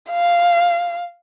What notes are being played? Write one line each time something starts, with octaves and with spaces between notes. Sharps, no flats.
F5